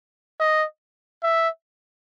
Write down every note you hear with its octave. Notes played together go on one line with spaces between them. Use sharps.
D#5
E5